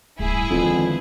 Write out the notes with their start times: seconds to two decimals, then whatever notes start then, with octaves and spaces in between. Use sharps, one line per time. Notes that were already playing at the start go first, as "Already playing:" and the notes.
0.19 D1 G2 E4 G#4
0.50 F2 D3 D#3 F3 G#3 B3